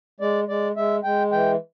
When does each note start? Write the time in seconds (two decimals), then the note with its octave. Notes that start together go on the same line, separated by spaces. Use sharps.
0.20 G#3 D5
0.48 G#3 D5
0.76 G#3 E5
1.03 G#3 G5
1.32 E3 G5